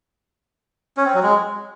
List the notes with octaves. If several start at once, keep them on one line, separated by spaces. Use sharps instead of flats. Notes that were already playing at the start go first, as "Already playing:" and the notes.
C#4
C4
F#3
G#3